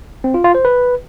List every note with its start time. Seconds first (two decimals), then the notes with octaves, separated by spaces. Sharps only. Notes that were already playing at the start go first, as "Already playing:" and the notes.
0.24 C4
0.34 F4
0.44 F4
0.55 C5
0.65 B4